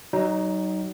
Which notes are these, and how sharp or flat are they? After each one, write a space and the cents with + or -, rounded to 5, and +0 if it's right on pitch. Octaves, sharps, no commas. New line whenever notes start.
F#3 +35 D#4 +0